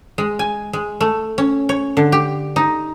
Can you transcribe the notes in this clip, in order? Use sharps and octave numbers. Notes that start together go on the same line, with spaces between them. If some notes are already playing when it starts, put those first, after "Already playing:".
G#3
G#5
G#3
A3
C#4
C#5
D3
G4
D#4